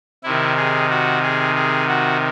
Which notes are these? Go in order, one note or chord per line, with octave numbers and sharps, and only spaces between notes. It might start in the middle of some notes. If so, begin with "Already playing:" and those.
C3 D#3 E4
G#4
F#4
G#4
G#4
F#4